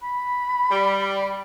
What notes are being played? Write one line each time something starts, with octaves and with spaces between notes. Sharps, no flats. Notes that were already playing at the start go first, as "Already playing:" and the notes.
B5
G3